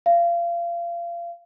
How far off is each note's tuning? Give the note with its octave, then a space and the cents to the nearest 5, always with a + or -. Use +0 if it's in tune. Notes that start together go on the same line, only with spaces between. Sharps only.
F5 -30